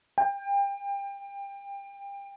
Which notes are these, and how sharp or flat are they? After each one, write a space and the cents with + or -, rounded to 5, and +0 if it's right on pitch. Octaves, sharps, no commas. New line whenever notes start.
G5 +30